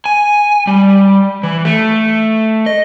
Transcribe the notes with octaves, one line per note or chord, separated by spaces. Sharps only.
G#5
G3
E3
A3
D#5